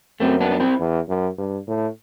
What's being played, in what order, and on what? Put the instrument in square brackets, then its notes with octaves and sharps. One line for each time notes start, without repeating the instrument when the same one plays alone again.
[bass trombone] F#2 [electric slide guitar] A3 C4
[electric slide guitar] B3 D4
D4
C4 E4
[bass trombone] E2
F#2
G2
A2